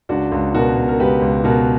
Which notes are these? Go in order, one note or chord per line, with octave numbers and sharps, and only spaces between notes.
C#2 D4 F#4
C#2
B2 F#4 A#4
B2
A#4
C#2 G4 B4
C#2
B2 F#4 A#4